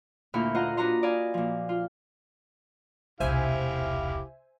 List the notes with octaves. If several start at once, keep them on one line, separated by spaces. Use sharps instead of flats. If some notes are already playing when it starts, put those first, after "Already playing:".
D2 A#2 E4 B5 F6 G6
F4 A#4 C5 D#5 F#5 A#5
D4 F#4 B4 D#5 A#5 C6
D5 D#5 F5 G#5 B5
A#2 F3
F4
E1 C2 E4 G4 C5 E5 F5 G#5